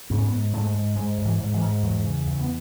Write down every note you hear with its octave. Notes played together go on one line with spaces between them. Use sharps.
G#2 B3
C#4
B3
G#2
G#2 A3
G#2
G#2 G#3
G#2
E3
G#2
E3
G#2
E2 F#3
C#3
E2
B3